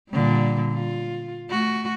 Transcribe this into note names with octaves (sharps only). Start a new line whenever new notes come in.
A#2 D3 G3
F4
A3 F#4